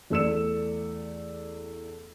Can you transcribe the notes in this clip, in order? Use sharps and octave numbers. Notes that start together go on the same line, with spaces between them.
E2 A3 D5 E6 C#7 E7